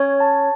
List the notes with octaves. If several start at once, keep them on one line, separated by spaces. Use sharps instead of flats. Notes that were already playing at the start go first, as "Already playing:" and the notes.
Already playing: C#4 C#5
A5